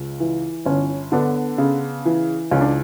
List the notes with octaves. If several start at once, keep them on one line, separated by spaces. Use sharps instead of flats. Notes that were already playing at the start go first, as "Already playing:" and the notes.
Already playing: C#2
E3
G1 C#4
D3 B3 D4
C#3
E3
C#2 C#4
D4